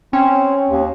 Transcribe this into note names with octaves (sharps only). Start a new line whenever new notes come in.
C4 C#4
D#2